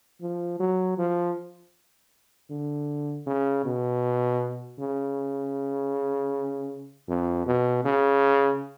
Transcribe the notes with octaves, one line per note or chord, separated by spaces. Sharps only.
F3
F#3
F3
D3
C#3
B2
C#3
F2
B2
C#3